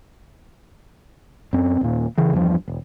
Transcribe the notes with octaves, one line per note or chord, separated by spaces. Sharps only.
F#2 C4
D#1 A#2
C#3 E3
E2 G2 F3
E1